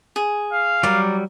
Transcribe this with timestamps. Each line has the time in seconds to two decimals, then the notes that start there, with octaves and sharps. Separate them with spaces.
0.16 G#4
0.53 F5
0.83 F#3 G3 A#4 D5